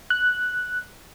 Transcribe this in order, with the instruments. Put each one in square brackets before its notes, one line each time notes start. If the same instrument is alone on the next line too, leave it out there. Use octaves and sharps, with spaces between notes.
[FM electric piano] F#6